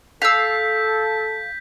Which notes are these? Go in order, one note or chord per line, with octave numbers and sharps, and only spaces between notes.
A4 F5 E6 G6 B6